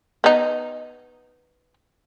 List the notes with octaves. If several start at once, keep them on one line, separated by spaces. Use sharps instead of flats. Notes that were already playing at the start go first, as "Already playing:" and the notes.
B3 D#4